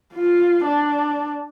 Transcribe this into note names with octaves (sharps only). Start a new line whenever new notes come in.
F4
D4